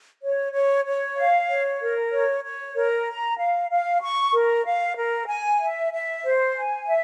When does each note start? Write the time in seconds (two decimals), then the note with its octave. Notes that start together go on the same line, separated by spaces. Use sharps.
0.22 C#5
0.53 C#5
0.85 C#5
1.17 F5
1.48 C#5
1.80 A#4
2.11 C#5
2.43 C#5
2.75 A#4
3.06 A#5
3.37 F5
3.69 F5
4.02 C#6
4.32 A#4
4.65 F5
4.96 A#4
5.28 G#5
5.59 E5
5.91 E5
6.23 C5
6.55 G#5
6.86 E5